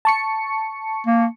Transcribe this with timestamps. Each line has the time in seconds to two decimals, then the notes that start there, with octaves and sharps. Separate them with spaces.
0.05 A5 C#6 C#7
1.07 A#3